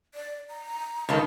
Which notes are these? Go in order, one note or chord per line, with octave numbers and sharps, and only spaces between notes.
D5
A#5
C#2 D#3 B3 F4 A4